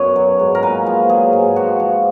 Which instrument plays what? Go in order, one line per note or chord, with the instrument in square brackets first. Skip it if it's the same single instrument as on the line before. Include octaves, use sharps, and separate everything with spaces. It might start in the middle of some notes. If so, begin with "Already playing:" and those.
Already playing: [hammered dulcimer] F#2 B2 B4 C#5
F#3
G#2
A#4
A#2 B4
F3
F#3 G#4
G#2
F3 F#4
F3